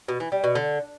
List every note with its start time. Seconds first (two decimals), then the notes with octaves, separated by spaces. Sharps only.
0.08 B2
0.20 E3
0.32 G3
0.44 B2
0.55 D3